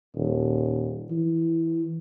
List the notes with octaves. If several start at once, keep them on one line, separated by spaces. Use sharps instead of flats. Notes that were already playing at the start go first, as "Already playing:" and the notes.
D#1
E3